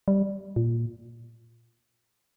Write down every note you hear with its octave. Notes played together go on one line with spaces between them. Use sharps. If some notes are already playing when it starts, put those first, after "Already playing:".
G3
A#2